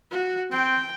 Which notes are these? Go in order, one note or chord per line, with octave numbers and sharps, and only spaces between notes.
F#4
C4 G5